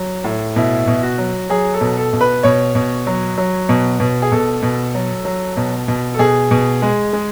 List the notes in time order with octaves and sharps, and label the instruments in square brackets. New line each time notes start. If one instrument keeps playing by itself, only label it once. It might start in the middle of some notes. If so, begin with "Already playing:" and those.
Already playing: [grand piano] F#3
A2
B2 E4
B2
F#4
F#3
F#3 G#4
A4
B2
A4
B2
B4
B2 C#5
B2
F#3
F#3
B2
B2
G#4
B2 A4
B2
F#3
F#3
B2
B2
A4
B2 G#4
B2
G#3
G#3